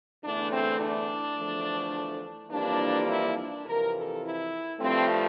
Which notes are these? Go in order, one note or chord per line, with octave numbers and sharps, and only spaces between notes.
E2 D3 A3 D4
C4
D4
E2 D3 F3 A3
F2 E3 G3 A#3 D4
E4
D4
F2 C3 E3 A#4
A4
E4
G2 F3 A3 C4